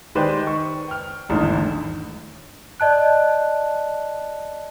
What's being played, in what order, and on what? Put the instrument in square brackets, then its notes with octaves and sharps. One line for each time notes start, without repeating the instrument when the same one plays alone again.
[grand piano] D#3 G#3 G4 B4 C5 D5
C#6
G5 F6
D#1 A1 E2 G#2 D3 D#3
[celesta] D5 D#5 A5 F#6